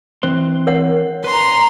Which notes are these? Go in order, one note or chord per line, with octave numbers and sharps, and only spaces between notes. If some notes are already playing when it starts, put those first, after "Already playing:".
E3 C4 C5 C6
A#4 C#5 F#5
B4 A#5 C6